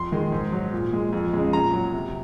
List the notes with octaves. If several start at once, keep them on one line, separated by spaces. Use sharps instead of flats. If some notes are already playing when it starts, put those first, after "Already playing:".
Already playing: F2 C6
D#3 G#3
G#2
F#3
A#2
G#3
F2
C#3 G#3
A#2 A#5
F#3
C3